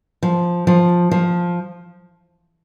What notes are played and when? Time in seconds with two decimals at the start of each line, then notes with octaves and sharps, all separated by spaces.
0.23 F3
0.67 F3
1.11 F3